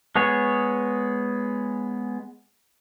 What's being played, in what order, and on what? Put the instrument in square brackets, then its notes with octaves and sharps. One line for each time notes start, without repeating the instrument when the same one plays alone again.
[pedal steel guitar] G#3 B3 G#4 C#5